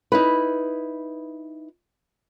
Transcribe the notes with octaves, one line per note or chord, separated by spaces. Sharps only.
D#4 E4 B4